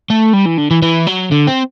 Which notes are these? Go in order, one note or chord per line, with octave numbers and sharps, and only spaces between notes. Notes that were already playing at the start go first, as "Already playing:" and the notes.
A3
G3
E3
D3
E3
E3
F#3
D3
C4